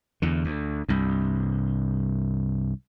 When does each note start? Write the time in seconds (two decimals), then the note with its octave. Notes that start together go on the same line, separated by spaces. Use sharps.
0.22 E2 D3
0.45 D2
0.89 C2 G2